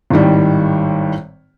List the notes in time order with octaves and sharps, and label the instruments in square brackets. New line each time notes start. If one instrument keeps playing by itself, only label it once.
[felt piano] G#1 A2 D#3 G3